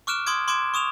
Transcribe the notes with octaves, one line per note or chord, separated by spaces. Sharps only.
C#6 D6 F6 F#6 D7 E7
C6 D6 D#6 G#6 D7
C6 D6 G#6 D7 E7
C#6 D#6 E7 F7